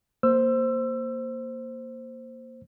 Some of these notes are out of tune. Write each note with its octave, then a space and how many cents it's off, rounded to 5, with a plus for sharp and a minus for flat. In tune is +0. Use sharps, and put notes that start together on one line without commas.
A#3 +0 C5 +0 E6 +20